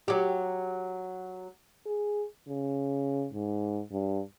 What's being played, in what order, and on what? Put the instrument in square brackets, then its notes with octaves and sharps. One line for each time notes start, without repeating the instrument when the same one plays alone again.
[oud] F#3 G4
[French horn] G#4
C#3
G#2
G2